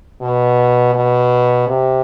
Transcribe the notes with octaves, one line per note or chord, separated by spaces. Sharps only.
B2
B2
C3